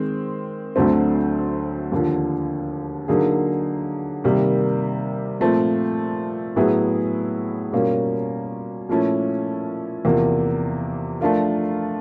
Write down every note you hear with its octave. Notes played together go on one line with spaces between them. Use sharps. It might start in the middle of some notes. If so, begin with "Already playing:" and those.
Already playing: D#3 G#3 C4
D2 D3 F#3 A3 C4
D#2 D3 F3
D3 F#3 A#3 D#4 G#4
C3 D#3 G3 A#3
A#2 F3 A3 C4
A2 F#3 B3 E4 G#4
B2 G3 A#3 C#4 F4
A#2 F3 A3 C#4 E4
E2 C3 F3 A#3
F3 A3 D4 F4 A#4